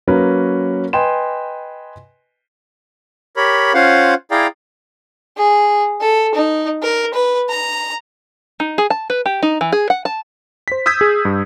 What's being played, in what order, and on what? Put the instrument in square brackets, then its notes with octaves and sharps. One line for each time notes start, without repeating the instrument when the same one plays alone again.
[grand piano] F#3 A#3 C#4 A#4 B4
B4 D#5 G5 G#5 C6 E7
[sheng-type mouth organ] G4 A#4 C#5 B5
C#4 F4 C5 F5 F#5
E4 G#4 D5 F5 G5 A#5
[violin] G#4
A4
D#4
A#4
B4
A#5
[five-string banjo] D#4
G#4
A5
B4
G4
D#4
E3
G#4
F#5
A5
[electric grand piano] C5 B6
D#6 E6 G6 G#6 B6
G#4
G2